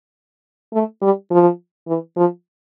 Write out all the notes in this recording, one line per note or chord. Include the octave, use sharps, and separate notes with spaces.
A3
G3
F3
E3
F3